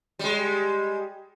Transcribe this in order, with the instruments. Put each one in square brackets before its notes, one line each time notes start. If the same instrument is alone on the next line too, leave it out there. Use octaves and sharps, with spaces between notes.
[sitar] G3 G#3